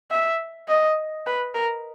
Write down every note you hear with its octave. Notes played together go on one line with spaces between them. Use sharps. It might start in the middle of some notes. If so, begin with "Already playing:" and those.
E5
D#5
B4
A#4